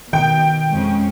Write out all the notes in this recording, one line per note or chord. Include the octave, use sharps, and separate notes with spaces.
B2 D#3 G5
F2 G#3 C#4